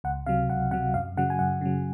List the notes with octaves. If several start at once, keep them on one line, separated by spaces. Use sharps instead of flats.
C#2 F#5
C3 F#3 F5
C#2 F#5
C3 F#3 F#5
F#2 F5
C#3 F#3 F#5
G#5
F#2 F#5
C#3 F#3